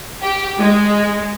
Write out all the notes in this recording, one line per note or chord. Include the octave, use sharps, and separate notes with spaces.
G4
G#3